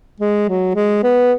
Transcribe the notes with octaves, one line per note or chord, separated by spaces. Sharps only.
G#3
F#3
G#3
B3